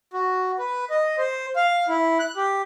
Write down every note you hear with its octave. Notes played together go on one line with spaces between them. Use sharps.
F#4
B4
D#5
C5
F5
E4
F#6
G4